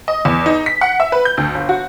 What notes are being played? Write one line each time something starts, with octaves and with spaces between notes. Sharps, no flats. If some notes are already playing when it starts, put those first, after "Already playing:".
D#5
E2
D#4
B6
F#5
E5
B4
G6
D2
G1
F#4